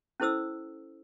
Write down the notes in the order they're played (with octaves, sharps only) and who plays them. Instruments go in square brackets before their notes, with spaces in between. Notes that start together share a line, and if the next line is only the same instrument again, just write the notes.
[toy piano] C#4 E4 A4 C5 D#6 E6